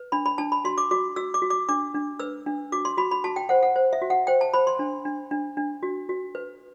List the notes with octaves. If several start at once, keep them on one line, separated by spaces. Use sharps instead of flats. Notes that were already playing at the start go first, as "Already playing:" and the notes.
Already playing: B4
D4 B5
B5
D4 A5
B5
F#4 C6
D6
F#4 D6
F#4 E6
D6
F#4
D6
D4 D6
D4
B4 E6
D4
F#4 D6
C6
F#4 B5
B5
F#4 A5
G5
C5 F#5
F#5
C5
E5
F#4
F#5
C5 G5
A5
C5 B5
C6
D4
D4
D4
D4
F#4
F#4
B4